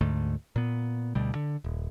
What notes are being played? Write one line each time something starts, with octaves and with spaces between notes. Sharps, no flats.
D2 G#2 D3 A3
A#2 B3
D2 B2 G3
D3
D#1